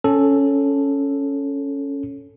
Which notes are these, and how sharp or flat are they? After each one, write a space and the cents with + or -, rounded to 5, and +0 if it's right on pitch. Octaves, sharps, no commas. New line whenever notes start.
C#4 +0 A4 +0